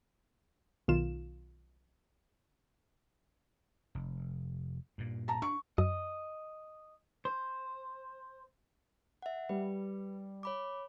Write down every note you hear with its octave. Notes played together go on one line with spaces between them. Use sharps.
B1 D#3 F4 E7
F1
G2 A#2
A5 A#5
D4 C#6
F#2 D#5
C5
E5 F#5
G3 B4
C#5 B5 D6